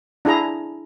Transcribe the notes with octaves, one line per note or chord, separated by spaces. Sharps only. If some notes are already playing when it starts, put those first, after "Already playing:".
D4 E4 G#4 A#5